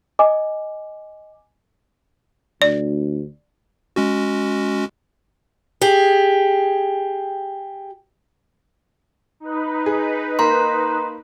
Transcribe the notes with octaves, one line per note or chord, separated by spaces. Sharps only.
D#5 G#5 D6
D2 D5
G#3 C#4 F#4
G4 G#4
D#4 B4
G#4
A#3 A#5 C6